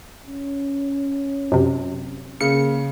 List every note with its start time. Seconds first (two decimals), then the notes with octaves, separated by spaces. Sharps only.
0.27 C#4
1.52 F#2 C3
2.41 C#3 A#3 C#7